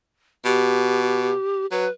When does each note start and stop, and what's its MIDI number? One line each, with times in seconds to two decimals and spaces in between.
0.45 1.32 47
0.45 1.66 67
1.71 1.86 54
1.71 1.90 71